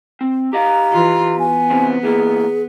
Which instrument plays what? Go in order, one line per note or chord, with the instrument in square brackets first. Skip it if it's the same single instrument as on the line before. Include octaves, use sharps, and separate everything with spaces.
[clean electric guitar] C4
[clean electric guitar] G4 D#5 F5 [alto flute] A#5
[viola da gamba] E3 F4
[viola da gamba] B3 [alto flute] G#5
[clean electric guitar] C3 E3 C4
[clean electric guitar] E3 A#3 [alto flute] G#4